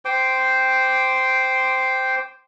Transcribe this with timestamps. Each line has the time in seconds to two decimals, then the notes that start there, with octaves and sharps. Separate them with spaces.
0.05 C5 G5 C6 D6